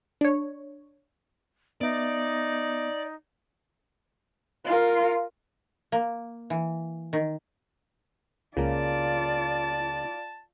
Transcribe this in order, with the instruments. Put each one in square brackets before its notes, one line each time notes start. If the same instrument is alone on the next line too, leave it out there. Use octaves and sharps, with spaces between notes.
[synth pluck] D4 C#5
[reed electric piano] B3 E5 [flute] D#4 [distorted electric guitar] D5
[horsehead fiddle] F4 A#4
[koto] A#3
E3
D#3
[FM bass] C#2 [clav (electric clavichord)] C#3 A#3 [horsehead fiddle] F4 D5 [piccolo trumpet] A5